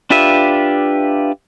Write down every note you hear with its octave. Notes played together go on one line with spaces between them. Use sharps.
D4 F4 G4 B4 E5